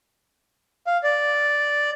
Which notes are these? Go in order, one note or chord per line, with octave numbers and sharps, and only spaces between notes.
F5
D5